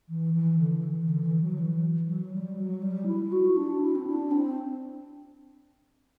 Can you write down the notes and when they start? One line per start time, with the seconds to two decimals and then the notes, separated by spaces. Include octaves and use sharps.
0.09 E3
0.34 E3
0.59 D3
0.83 E3
1.08 D3
1.25 E3
1.41 F#3
1.58 E3
2.07 F#3
2.33 G3
2.57 F#3
2.82 G3
3.06 E4
3.32 F#4
3.56 D4
3.81 E4
3.95 C4
4.06 D4
4.31 C4